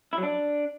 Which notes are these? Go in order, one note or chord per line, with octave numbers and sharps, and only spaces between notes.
E4
F#3
D4